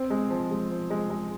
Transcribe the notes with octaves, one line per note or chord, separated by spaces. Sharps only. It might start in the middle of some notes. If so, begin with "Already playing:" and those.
Already playing: C4
G#3
F3
G#3
F3
G#3
G#3